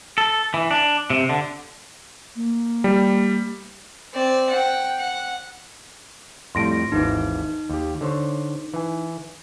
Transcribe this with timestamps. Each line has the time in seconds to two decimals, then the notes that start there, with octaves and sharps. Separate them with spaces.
0.18 A4
0.54 E3
0.71 D4
1.10 C3
1.29 D3
2.36 A#3
2.84 G3
4.14 C4 D5
4.50 F#5 G5
4.99 F#5
6.55 F2 A2 G3 C6 A#6 D7
6.92 G#1 D#2 E3 D#4
7.70 D#2 G4
8.01 D3 C5 C#5
8.74 E3 G#5